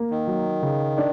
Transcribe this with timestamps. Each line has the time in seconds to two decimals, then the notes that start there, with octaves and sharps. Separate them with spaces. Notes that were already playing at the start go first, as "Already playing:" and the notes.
Already playing: A#3
0.10 D#3
0.27 F#3
0.62 C#3
0.98 D4